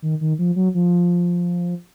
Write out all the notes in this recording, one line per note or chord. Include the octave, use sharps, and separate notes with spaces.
D#3
D#3
F3
F#3
F3